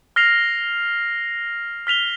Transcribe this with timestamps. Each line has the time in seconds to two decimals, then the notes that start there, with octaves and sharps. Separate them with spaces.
0.16 F6 A#6 C7 F7
1.87 F6 B6 F7 G7